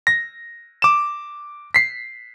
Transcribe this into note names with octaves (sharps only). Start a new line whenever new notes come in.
A#6
D6 E7
B6 C7